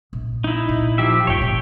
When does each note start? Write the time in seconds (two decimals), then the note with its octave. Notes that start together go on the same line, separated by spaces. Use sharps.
0.13 A#1
0.44 D#4 E4
0.69 A#2 D#3
0.98 F3 G4 E5
1.27 D2 G2 C#5 G5
1.42 A#2 D#3